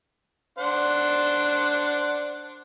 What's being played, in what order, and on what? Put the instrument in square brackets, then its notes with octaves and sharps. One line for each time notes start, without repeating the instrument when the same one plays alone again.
[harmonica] D4 C5 F#5